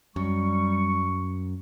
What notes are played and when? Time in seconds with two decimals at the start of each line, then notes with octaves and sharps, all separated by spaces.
0.16 F#2 G3 C#6